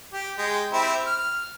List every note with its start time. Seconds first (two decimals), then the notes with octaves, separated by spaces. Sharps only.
0.13 G4
0.38 G#3 G5
0.73 C4 E4 G4
1.07 F6